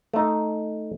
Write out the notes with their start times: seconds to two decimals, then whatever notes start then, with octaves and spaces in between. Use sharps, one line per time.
0.14 A3 D#4